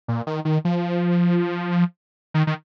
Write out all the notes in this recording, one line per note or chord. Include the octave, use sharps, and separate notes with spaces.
A#2
D#3
D#3
F3
D#3
D#3